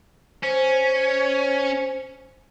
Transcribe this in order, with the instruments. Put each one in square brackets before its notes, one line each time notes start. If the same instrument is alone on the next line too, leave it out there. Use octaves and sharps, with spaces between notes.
[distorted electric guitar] C#4 [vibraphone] C5